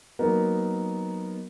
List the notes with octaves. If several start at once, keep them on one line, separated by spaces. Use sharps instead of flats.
F#3 A#3 B3 D#4 A#4